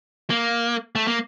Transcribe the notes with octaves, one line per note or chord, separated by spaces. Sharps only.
A#3
A3
A#3